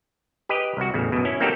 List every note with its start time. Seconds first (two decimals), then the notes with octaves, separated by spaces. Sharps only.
0.49 G4 B4 D#5
0.77 C2 F#4
0.94 A1 E2 C#3
1.12 F#2 B2
1.25 C#4 E4
1.40 A#3 C4 D#4 F#4 G4 A4